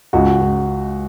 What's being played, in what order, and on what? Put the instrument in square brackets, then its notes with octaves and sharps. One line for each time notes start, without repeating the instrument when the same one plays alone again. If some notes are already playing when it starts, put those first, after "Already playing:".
[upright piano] C#2 [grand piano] F#4
[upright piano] C#2